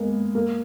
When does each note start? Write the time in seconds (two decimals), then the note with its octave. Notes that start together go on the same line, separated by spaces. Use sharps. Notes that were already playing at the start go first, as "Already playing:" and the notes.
Already playing: G#3 A#3 B3
0.35 A#3